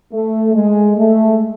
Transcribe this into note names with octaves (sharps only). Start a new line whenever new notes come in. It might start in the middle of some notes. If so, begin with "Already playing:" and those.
A3
G#3
A3